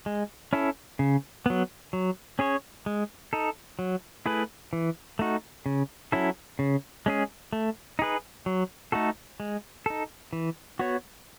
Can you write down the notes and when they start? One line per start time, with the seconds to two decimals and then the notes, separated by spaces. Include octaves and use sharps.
0.06 G#3
0.53 C#4 E4 A4
0.99 C#3
1.46 F#3 B3
1.93 F#3
2.39 C#4 G#4 C#5
2.86 G#3
3.33 D#4 A4
3.79 F#3
4.26 A3 E4 G#4 B4
4.73 E3
5.19 A3 D#4 F#4
5.66 C#3
6.12 F#3 C#4 E4 A4
6.59 C#3
7.06 G#3 C#4 G#4
7.53 A3
7.99 D#4 G#4 B4
8.46 F#3
8.92 A3 D#4 F#4 A4
9.40 G#3
9.86 D#4 A4
10.33 E3
10.79 B3 F#4 C#5